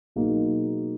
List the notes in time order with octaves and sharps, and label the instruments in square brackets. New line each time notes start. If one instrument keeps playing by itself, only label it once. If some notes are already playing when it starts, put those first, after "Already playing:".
[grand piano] B2 F#3 A#3 D#4 G#4